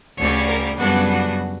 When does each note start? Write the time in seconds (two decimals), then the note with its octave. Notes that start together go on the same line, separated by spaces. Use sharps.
0.16 D2 C#3 G3 C#5
0.47 A#4
0.78 F#2 C#3 G3 B3 D4 F#4
1.09 F#4